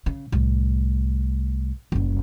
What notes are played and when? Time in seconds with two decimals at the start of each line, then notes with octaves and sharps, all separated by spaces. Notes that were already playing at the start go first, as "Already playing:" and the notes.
0.06 C#3
0.32 C2 A2
1.92 F#1 C2